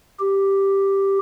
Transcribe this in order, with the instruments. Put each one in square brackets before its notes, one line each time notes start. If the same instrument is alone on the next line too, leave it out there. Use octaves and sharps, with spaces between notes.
[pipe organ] G4